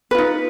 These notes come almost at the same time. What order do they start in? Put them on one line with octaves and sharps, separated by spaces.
B4 F4 D#4